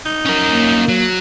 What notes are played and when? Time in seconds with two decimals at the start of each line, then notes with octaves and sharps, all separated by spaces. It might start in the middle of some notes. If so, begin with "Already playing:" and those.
0.06 D#4
0.25 C#4 A#4
0.49 A#3
0.88 F#3